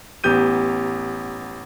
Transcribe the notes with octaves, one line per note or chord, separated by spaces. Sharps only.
A1 B3 G4 G6 D#7